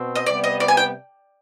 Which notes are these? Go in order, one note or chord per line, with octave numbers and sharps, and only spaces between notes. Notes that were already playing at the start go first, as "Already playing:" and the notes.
Already playing: B2 C4
D#5
C3 G3 B3 D5
D#5
D5
G#5
G5